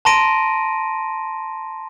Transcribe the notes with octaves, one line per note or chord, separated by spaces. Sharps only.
A5 A#5 C6 A#6 D7 D#7